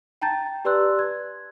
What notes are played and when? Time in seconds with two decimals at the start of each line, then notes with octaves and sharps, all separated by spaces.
0.22 G5 A5 A#5 G6 A6
0.65 G4 B4 D5 C6 E6 F#6
0.99 G#6